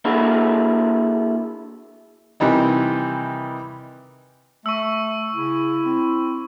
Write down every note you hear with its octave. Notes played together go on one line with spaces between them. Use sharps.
A#3 D4 E4 F#4 G#4 A4
C3 D#3 E3 G3 D#4
A3 C#6 E6
C#3 E4
C4